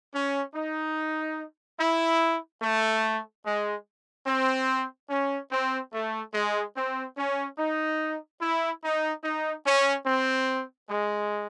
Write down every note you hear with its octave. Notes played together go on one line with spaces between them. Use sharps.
C#4
D#4
E4
A3
G#3
C4
C#4
C4
A3
G#3
C4
C#4
D#4
E4
D#4
D#4
C#4
C4
G#3